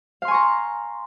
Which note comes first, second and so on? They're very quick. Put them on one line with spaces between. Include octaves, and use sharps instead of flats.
F5 C6 G#5 C#6 A#5